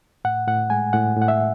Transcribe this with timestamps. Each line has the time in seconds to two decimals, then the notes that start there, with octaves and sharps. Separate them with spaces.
0.25 A2 F#5
0.47 A2 F#5
0.70 G#3 G#5
0.93 A2 F#5
1.16 A2
1.22 F#5
1.28 E5